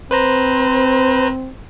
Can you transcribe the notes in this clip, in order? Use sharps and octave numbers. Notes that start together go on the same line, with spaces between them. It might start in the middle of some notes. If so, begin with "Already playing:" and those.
C4 B4 C5 A#5